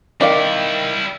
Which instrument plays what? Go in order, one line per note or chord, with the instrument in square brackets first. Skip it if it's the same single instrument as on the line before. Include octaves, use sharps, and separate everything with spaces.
[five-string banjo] D#3 D5 F5 [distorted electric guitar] G3 E4